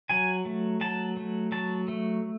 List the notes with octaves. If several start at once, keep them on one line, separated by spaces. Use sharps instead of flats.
F#3 G#5
A3
F#3 A5
A3
F#3 A5
A3